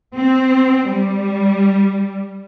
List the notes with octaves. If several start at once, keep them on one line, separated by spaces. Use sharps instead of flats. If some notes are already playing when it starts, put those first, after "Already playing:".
C4
G3